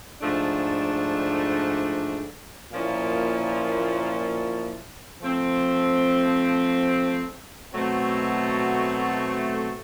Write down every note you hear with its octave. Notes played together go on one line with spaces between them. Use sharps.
G#2 F3 A3 D4
A#2 F3 A#3 C#4 E4
F3 A3 C4
B2 F#3 A3 C4